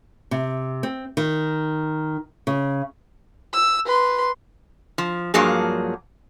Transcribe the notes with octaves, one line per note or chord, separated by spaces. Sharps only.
C3
C4
D#3
C#3
E6
B4 C6
F3
G2 F3 F#3 A#3 G#4